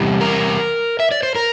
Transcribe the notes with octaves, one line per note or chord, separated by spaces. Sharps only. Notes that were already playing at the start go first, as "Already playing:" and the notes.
Already playing: E2 C3 G3
A#4
E5
D5
C5
A#4